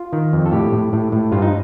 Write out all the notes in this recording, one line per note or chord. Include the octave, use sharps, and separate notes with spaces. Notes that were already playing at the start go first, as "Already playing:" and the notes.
Already playing: F4
D#3
F2
A4
A2 G4
A2
A2
A2
G2 F4
D#4